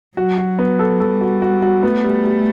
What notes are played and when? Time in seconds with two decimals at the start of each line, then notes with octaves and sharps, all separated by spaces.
0.17 F#3 F#4
0.38 F#4
0.59 B3
0.79 A4
1.00 G3 A4
1.21 F#4
1.42 F#4
1.62 F#4
1.83 A3 B3
2.04 G3
2.24 G3